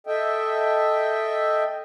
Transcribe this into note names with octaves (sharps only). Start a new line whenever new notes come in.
A4 D#5 E5 G5